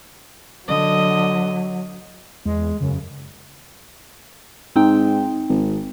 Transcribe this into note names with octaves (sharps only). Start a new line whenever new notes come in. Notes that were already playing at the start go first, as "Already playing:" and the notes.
D3 F#3 D#5
E2 G#3
F#2 C#3
G#2 C4 D#4 G5
G#1